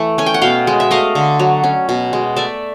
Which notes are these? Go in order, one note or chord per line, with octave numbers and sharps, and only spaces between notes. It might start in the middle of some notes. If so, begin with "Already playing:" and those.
Already playing: E3 A3
C#4 G#5
G5
F#5
B2 F5 G5
G#3
E5
A3 D#5 F5
D3
F#3
C#4
B2
G#3
A3 D5 E5